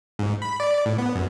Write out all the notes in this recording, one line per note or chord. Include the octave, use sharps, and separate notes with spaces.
G#2
B5
D5
A2
B3
F#2